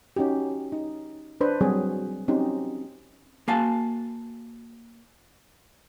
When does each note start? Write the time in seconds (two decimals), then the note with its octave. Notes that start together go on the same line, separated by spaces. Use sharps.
0.16 C#4 D#4 F#4 G4
0.72 D#4
1.41 D4 B4 C5
1.61 F#3 G3 C4 F#4 G#4 C#5
2.28 C4 C#4 D#4 F#4 G4
3.48 A#3 F#4 F5 G#5 A5